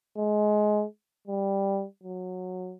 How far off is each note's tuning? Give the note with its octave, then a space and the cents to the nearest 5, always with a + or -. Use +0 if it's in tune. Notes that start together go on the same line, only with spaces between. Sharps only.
G#3 +20
G3 +5
F#3 -15